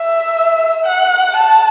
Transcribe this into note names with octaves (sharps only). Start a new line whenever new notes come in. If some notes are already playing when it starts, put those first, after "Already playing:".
Already playing: E5
F#5
A5